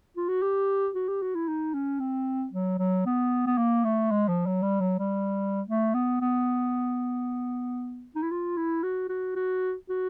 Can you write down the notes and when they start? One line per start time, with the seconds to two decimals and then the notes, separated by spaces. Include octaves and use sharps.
0.17 F4
0.29 F#4
0.42 G4
0.95 F#4
1.08 G4
1.22 F#4
1.35 E4
1.48 D#4
1.74 C#4
2.00 C4
2.53 F#3
2.78 F#3
3.06 B3
3.46 B3
3.58 A#3
3.84 A3
4.11 G#3
4.28 F3
4.46 F#3
4.62 G3
4.81 F#3
4.99 G3
5.68 A3
5.94 B3
6.21 B3
8.15 D#4
8.22 E4
8.31 F4
8.57 E4
8.83 F#4
9.09 F#4
9.36 F#4
9.89 F#4